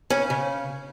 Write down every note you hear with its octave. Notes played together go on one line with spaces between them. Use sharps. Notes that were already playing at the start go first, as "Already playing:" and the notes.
C#3 C#4
C#3